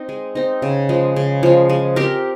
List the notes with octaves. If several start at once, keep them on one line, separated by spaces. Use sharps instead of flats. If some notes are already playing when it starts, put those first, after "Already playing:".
Already playing: C4 D#4
G#3
C4 D#4
C#3
F3 G#3
C#3
F3 G#3
G#3
C4 G4 A#4